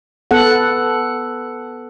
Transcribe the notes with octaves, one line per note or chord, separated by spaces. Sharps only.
B3 A4 F#5